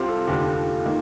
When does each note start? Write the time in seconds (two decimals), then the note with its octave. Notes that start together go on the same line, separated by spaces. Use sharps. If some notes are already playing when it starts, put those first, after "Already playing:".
Already playing: C2 C3 C4 F4
0.08 A4
0.27 F1 D#2 D3 G4
0.85 D#3 A#3 D#4